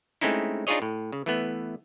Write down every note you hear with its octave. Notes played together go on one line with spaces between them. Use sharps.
G#3 A3 C4 C#4 D#4 E4
D4 D#4 F4 G#4 C#5 D#5
A2
C#3
E3 A3 B3